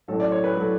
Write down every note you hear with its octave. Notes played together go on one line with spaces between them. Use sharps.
A1 A2 F#3 A3 A4
D5
C#5
B4
A2 F#3 A3